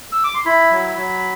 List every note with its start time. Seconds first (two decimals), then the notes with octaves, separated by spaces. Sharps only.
0.12 E6
0.24 D6
0.34 C6
0.45 E4 B5
0.71 F#3
0.97 F#3